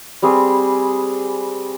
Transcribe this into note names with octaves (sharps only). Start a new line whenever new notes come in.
G3 C4 G#4 B4